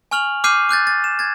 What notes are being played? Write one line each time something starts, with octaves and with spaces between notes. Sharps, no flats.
G#5 C#6 F6 F7 F#7
D6 F6 G6 C7 D#7
D6 F#6 G6 A6
A6
E7
G#6 A6